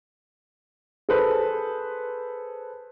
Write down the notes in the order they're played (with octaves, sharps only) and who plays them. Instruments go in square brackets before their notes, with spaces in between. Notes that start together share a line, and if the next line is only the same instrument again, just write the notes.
[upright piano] G#4 A4 B4 C5